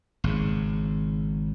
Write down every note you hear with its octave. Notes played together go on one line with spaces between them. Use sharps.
G#1 C#3